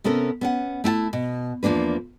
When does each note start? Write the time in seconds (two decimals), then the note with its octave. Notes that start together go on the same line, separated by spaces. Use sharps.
0.04 C3 B3 C#4 A4 A#4
0.41 B3 C#4 F#5
0.84 A3 E4 F5 A5
1.13 B2
1.63 E2 F3 A#3 D4 B4